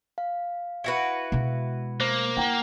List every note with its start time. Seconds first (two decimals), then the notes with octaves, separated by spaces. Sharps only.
0.18 F5
0.84 E4 F#4 B4
1.32 B2 G#3
2.00 A#3 C5
2.37 E4 F#5 G5 A#5